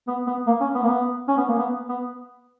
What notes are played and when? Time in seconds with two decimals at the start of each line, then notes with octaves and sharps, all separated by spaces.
0.08 B3
0.27 B3
0.47 A#3
0.61 C#4
0.75 B3
0.84 A#3
0.88 B3
1.28 C#4
1.38 B3
1.49 A#3
1.59 B3
1.89 B3